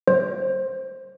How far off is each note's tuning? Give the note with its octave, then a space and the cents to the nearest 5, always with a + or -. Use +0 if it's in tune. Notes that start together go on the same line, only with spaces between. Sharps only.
C5 +15